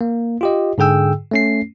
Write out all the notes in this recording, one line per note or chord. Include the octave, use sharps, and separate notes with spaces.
A#3
F4 G4 D#5
G#2 D3 G#4 G5 E6
A3 C#4 C7